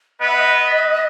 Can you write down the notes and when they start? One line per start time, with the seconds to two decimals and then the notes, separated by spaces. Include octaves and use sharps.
0.20 B3 B4 D#5
0.27 E5
0.34 D#5